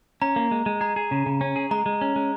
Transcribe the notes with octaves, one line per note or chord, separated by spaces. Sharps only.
C#4 A#5
A#3
G#3
G#3
G#4 A#5
G#4
C#3
C#3
C#4
G#4
G#3 A#5
G#3
C#4
G#3